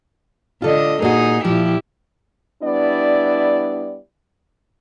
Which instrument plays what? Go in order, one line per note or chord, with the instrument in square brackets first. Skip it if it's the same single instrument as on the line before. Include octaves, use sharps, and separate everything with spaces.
[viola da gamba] D3 D#5 [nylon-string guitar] F4 A4
[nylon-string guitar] A#2 F#4 [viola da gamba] D#4 G#4
[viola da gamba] A#2 E4 G4 [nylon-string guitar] F3
[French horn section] G3 B3 D4 E4 D5